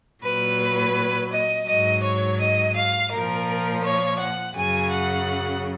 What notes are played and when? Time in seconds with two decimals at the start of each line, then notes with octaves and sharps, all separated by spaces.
0.23 A#2 F#3 B4
1.31 D#5
1.67 G#2 F#3 D#5
2.03 C#5
2.39 D#5
2.76 F5
3.12 A#2 F3 A#4
3.83 C#5
4.19 F#5
4.55 F#2 C#3 F#3 G#5
4.91 F#5